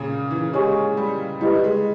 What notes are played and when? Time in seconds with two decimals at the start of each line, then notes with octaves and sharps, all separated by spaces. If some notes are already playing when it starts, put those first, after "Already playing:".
Already playing: A#2 C#3
0.31 E3
0.53 G#3 G4 C#5 G#5 C#6
0.97 G3
1.41 G3 E4 G4 B4 D#5
1.64 G#3